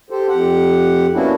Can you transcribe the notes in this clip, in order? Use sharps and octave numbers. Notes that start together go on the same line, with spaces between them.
G4 A4 C5
F2 G4 F#5
A#3 B3 C#4 D4 E4 F#4